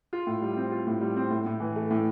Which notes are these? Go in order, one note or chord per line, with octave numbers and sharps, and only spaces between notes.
F4
A2
G3
C4
F4
A2
G3
C4
A2
A2
E3
A3
A2